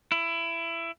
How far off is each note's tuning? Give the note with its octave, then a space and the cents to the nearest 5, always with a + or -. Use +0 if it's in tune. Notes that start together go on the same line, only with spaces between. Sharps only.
E4 +20